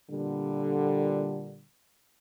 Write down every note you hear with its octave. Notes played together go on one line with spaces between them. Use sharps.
A#2 D3 G3